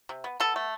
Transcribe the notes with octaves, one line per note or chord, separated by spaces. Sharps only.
C3
B3
B3 A4
A3